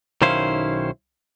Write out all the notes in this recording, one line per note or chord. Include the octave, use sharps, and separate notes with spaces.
B1 D#3 C#4 E4 C5 F5